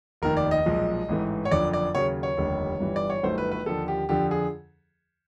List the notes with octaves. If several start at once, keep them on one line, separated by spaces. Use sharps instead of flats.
F1 D#2 D#3 A#4
D5
D#5
B1 A#2 F3 G#3
A1 G#2 E3 A3
C#5
F#1 F2 D3 D5
D5
D#2 C#3 F#3 C#5
C#5
F1 D#2 D3 G3
G1 G2 E3 G3
D5
C#5
G1 G2 D#3 F#3 A3 C5
B4
B4
D#2 D3 F3 A4
G4
F2 D3 F3 G4
G#4